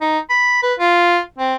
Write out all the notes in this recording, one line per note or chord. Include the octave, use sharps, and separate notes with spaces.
D#4
B5
B4
F4
C4